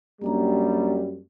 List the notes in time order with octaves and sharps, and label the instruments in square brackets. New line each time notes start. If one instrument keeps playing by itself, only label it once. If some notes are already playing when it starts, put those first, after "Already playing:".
[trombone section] F#2 G3 [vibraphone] A#3 D4 A#5